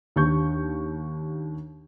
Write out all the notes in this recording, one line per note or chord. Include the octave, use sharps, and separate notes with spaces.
D#2 D4 G4 C#6 G6